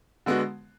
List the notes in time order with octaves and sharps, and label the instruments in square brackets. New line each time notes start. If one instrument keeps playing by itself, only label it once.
[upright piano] D3 G#3 B3 F#4